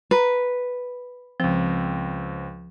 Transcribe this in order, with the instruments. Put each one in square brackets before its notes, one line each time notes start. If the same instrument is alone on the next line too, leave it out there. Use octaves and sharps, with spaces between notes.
[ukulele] B4 [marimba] A#5
[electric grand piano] C#2 C4 [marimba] F3